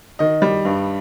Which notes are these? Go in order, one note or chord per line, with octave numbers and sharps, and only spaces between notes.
D#3 D#5
G3
G2